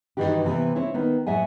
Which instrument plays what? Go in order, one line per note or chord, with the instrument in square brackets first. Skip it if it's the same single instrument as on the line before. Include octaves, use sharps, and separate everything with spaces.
[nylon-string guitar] G2 A#2 D#3 E3 F#4 G4
C3 E3 B3
C4 E4 C#5
D#3 B3
A2 F#3 E5 F#5 G#5